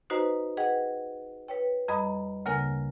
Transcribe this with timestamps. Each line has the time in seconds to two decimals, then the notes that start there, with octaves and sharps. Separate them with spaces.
0.10 D#4 F#4 B4 C5 D#5 A#5
0.57 G#4 B4 D#5 F#5 G5
1.48 B4 C#5 G5
1.88 F2 G3 D#5 A#5 B5 D#6
2.46 D2 C#3 A#3 A#4 G#5 F6